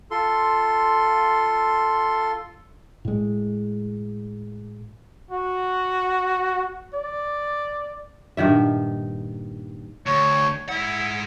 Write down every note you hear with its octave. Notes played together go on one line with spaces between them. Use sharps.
F4 A4 C6
A2 G#3
F#4
D5
G2 A#2 D#3 E5
D2 C#5
G#2 E4 F#5